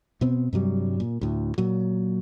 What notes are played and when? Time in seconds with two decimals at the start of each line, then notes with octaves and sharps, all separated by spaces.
0.21 B2 B3 C4
0.53 G2 C3 F#3 G3
1.00 A#2
1.21 D2 A2
1.58 A#2 F#3